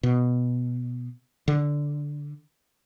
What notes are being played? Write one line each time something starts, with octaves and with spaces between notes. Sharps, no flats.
B2
D3